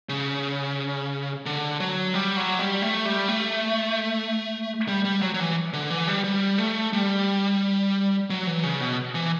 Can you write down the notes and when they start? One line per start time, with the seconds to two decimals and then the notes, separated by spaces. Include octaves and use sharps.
0.09 C#3
1.46 D3
1.80 F#3
2.14 G3
2.37 F#3
2.59 G3
2.82 A3
3.05 G3
3.28 A3
4.88 G3
5.05 G3
5.22 F#3
5.34 F#3
5.39 E3
5.73 D3
5.90 E3
6.08 G3
6.24 G3
6.58 A3
6.93 G3
8.30 F#3
8.47 E3
8.63 C#3
8.80 B2
9.15 E3